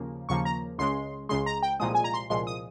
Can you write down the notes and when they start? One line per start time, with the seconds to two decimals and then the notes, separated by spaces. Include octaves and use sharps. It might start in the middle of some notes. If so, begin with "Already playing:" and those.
Already playing: D#2 C#3 F3 A#3
0.29 D#2 C#3 F3 A#3 C#6
0.45 A#5
0.78 C#2 C#3 G#3 C6
1.29 C#2 C#3 G#3 C6
1.46 A#5
1.63 G5
1.80 C2 A#2 F3 G#3 D#6
1.95 G#5
2.04 A#5
2.14 C6
2.30 C2 A#2 F3 G#3 C6
2.47 D#6